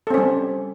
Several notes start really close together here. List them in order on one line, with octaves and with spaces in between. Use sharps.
A4 C4 C#4 G3